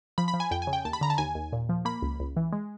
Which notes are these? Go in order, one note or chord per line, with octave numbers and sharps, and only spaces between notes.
F3 B5
B5
F3
G#5
F2 G5
G#5
C#3
G5
D#2 A5
B5
D3 A#5
A5
D#2 G#5
D#2
A#2
F3
A#3 B5
C#2
C#2
E3
G#3